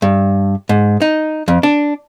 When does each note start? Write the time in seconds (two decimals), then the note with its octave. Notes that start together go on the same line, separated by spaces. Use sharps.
0.02 G2
0.69 G#2
1.02 D#4
1.48 F2
1.63 D4